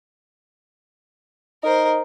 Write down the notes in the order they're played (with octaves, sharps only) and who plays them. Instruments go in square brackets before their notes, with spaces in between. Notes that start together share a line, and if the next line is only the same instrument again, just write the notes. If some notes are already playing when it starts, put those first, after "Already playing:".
[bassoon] D#4 [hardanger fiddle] A#4 C5